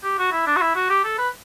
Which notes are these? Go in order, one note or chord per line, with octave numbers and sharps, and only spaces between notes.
G4
F#4
E4
D4
F#4
E4
F#4
G4
A4
B4